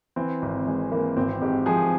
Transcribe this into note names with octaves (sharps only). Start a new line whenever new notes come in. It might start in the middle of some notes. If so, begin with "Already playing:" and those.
E3 C4
G#1
E3 G#3
E3 A#3
G#1 C4
G#2 G4
F3 G#4